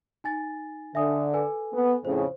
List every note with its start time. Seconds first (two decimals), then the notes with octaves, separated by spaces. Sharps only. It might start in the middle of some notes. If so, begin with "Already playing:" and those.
0.24 D#4 G#5 A6
0.95 D3 E5 G#5 D#6
1.34 A4 B4 G#5
1.73 B3
2.05 F2 A2 C#3 C5